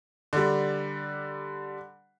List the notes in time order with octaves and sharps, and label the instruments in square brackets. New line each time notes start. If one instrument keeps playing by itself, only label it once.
[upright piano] D3 G3